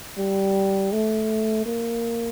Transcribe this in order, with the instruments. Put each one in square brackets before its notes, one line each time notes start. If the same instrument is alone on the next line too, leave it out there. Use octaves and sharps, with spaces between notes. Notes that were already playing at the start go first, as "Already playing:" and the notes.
[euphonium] G3
A3
A#3